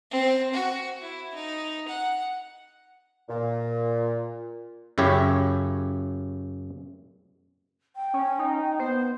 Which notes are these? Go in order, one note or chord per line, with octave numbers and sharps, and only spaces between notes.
C4
F#4
E4
D#4
F#5
A#2
F#2 C#3 E4 G4 C#5
G5
C#4
D#4
B3 C5